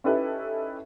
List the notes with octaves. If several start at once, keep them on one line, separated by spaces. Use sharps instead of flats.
C#4 D#4 E4 G4 A4 B4